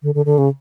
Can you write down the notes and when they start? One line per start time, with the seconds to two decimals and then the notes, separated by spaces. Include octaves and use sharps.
0.03 D3
0.15 D3
0.26 D3
0.38 C#3